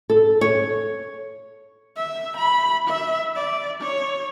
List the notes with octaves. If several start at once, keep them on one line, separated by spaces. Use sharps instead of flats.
A4
C#5
E5
B5
E5
D5
C#5